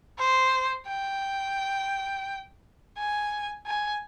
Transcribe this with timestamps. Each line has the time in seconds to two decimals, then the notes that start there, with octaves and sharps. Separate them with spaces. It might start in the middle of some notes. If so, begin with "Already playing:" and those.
0.18 C5
0.88 G5
2.97 G#5
3.66 G#5